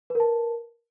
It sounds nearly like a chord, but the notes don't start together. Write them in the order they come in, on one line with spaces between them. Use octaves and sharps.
B4 A#4 A5